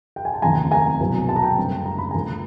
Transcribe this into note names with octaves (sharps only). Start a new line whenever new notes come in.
G5
G#5
A5
F1 D#2 C#3 F3 G#5 A#5
G#5 A#5
C2 B2 F#3 B3
A5
A#5
G5 A5
F#1 F#2 D3 G3
A#5
B5
D2 D3 F3 G#5 A#5